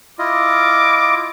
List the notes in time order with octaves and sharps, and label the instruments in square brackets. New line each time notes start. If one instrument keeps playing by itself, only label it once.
[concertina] E4 F4 D#5 [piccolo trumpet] D6